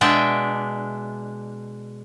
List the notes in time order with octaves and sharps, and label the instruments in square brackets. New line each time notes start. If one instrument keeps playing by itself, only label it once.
[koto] B2 G#3 D4 E5 G5